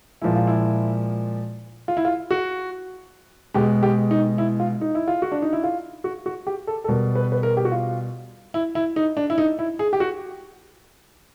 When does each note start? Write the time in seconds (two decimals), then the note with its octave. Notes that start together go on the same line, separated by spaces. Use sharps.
0.22 A#2 F3 G#3 E4
0.35 F4
0.47 E4
1.88 F4
1.97 E4
2.05 F4
2.31 F#4
3.54 B2 G#3 G4
3.83 G4
4.11 D#4
4.38 E4
4.60 F4
4.81 D#4
4.95 E4
5.08 F4
5.22 F#4
5.32 D4
5.42 D#4
5.53 E4
5.64 F4
6.04 F#4
6.26 F#4
6.47 G4
6.67 A4
6.84 A4
6.88 B2 G3 A#4
7.15 B4
7.32 B4
7.43 A#4
7.57 G4
7.65 F#4
7.72 F4
8.54 E4
8.75 E4
8.96 D#4
9.17 D4
9.30 E4
9.38 D#4
9.59 E4
9.79 G#4
9.93 G4
10.00 F#4